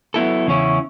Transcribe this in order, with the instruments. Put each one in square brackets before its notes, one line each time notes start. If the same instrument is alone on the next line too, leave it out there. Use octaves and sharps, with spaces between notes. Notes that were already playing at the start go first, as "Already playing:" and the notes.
[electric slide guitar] F#3 B3 E4 A4
E2 C#3 F#3 C#4 E4